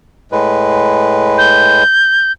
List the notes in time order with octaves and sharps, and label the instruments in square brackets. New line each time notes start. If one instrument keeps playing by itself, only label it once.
[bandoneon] A2 G#3 B4
[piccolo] G6